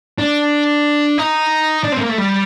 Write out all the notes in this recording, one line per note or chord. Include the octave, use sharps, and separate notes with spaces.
D4
D#4
D4
C4
A3
A#3
A3
G3